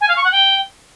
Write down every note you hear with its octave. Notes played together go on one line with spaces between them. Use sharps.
G#5
F5
C#6
F#5
G5